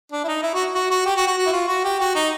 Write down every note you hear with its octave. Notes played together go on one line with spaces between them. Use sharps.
D4
E4
D#4
E4
F#4
F#4
F#4
G4
F#4
F#4
F#4
E4
F4
F#4
G4
F#4
D#4